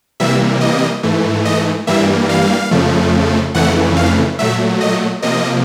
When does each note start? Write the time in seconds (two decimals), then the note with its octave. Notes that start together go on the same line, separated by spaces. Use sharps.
0.20 C3 E3 G3 A#3 E5
0.61 D#5
1.03 G#2 E3 A3
1.45 D#5
1.87 G2 E3 G3 A#3 E5
2.29 F5
2.71 F2 C#3 F3 A3
3.55 F2 C#3 E3 A3 F#5
3.96 F5
4.39 A#2 F#3 A3 E5
4.81 D#5
5.22 C3 F3 A#3 D#5